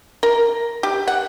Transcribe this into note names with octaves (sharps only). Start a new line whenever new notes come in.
A#4
G4
F#5